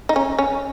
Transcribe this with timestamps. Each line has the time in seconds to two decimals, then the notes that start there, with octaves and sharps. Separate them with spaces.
0.09 D#4
0.16 C#4
0.39 C#4